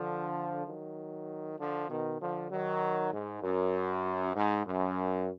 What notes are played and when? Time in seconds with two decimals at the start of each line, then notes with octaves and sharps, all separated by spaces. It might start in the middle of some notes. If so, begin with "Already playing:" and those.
Already playing: D3 F3
0.67 D#3 F#3
1.58 D3 F3
1.89 B2 D#3
2.20 D3 F3
2.51 D#3 F#3
3.12 G#2
3.42 F#2
4.35 G#2
4.65 F#2